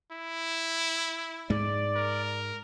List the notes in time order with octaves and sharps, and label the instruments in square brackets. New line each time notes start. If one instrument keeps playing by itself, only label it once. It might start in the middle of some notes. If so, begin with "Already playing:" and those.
[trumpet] E4
[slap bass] G#2 G#3 [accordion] D5
[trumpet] A#4